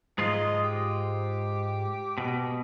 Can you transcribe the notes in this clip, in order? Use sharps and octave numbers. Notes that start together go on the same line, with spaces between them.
G#2 G#3 F4 D#5
G4
B2